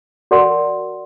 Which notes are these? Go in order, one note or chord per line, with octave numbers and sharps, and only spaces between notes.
F#4 A#4 D5 F#5 C6